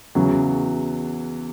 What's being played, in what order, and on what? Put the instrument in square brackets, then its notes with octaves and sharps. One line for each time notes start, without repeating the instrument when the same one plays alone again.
[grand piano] E2 C#3 F#3